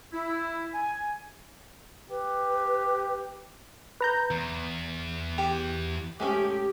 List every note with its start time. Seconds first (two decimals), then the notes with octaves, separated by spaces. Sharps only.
0.13 E4
0.73 G#5
2.10 G4 B4
4.01 B4 A#5 G6
4.31 E2
5.38 G4
6.20 G#3 A3 C#4 G4